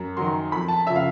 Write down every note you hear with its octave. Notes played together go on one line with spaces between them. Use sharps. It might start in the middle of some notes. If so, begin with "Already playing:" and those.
Already playing: F#2
D#3 F#3 C6
F2 B5
A5
C#3 F3 E5
F5